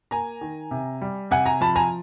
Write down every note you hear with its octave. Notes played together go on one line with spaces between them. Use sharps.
A#3 G#5 A#5
D#3
C3
G3
C3 F#5 G#5
G#5 A#5
F3 A5 B5
G#5 A#5